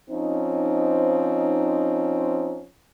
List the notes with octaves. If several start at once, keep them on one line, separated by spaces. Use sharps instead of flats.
F3 C4 C#4 D#4